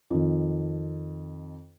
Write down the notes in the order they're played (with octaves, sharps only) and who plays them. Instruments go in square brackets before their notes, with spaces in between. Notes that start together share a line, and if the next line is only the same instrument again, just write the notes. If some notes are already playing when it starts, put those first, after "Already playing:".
[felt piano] F2 D#3